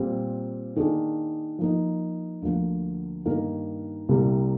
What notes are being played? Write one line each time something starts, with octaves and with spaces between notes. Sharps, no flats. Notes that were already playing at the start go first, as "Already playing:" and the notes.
Already playing: A#2 G3 C4
D#3 A#3 D4 G#4
F3 A#3 D#4
D2 D3 F3 A#3
G2 D#3 A#3 D#4 A#4
C2 C3 G3 A#3